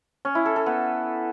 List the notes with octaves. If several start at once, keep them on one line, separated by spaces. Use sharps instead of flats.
C#4
E4
A4
A4
B3